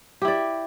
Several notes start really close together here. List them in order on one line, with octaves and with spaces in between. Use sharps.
G4 E4 D5